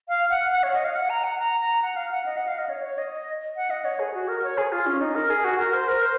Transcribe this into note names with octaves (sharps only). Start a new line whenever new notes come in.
F5
F#5
F#5
C#5
D#5
F5
F#5
A#5
F#5
A#5
A#5
F#5
F5
F#5
D#5
F#5
F5
D#5
C#5
C#5
D#5
F#5
D#5
C#5
G#4
F#4
A#4
C#5
G#4
F4
C#4
D#4
A#4
G#4
F#4
A#4
C5
A#4
C5